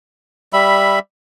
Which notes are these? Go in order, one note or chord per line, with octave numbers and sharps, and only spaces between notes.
G3 E5 B5